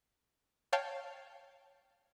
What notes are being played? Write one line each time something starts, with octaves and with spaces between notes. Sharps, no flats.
C#5 F5 G5 A5